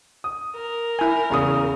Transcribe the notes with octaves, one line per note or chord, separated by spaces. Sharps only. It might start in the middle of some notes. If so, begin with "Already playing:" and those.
D#6
A#4
E4 G#5
E2 C#3 D#6